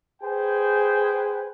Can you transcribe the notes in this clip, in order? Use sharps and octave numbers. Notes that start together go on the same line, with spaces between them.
G#4 B4 C5 G5 G#5